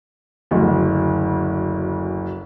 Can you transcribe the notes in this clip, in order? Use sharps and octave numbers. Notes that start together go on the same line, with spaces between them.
F#1 D2